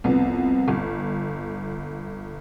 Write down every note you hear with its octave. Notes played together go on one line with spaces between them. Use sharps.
C2 F2 B3
G1